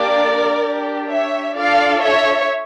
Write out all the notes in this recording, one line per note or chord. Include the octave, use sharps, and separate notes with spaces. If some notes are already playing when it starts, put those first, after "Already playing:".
Already playing: A#3 D4 G4 A#4 D5
D4 G4
C#5 E5
D4 F4 A4 D5 F5
C#5 E5